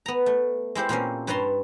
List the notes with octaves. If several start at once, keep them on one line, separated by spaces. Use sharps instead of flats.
B3 A#5
A3
G#3 E4 G4 C5
A#2 A#3 C4 C#4
G2 B4 C#5 A5 A#5 C6